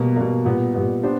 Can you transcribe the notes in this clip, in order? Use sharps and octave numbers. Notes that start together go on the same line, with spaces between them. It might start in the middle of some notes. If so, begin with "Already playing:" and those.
Already playing: B2 G3 A#3
B2 G3 A#3
A#2 G3 B3
A#2 G3 B3
B3 D4 G4 C5